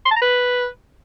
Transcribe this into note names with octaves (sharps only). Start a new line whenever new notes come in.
C6
A5
A#5
B4